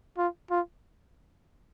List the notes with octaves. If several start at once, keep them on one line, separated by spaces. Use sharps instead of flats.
F4
F4